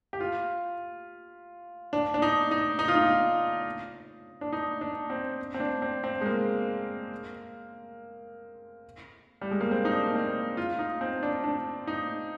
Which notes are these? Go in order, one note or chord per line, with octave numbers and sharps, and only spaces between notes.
G4
F4
D4
D4
D#4
D#4
D#4
F4
D#4
D4
D#4
D4
C4
C4
D4
C4
C4
G#3
A#3
G3
G#3
A#3
C4
D#4
D4
A#3
C4
F4
D#4
C4
D4
D4
D#4